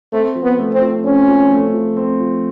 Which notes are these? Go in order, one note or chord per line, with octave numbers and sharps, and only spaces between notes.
A3 C4
F3
B3
A3
C4
F3
C4 C#4
F3
A3
F3
C4
F3